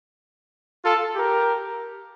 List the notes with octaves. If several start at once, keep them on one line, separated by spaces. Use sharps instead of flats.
F4 A4
G4 A#4